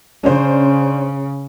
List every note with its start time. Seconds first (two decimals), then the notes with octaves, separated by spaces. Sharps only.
0.24 C#3 C#4 D4 C5